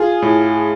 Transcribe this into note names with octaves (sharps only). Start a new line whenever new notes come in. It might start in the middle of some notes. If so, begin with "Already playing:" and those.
Already playing: F4 G#4
A2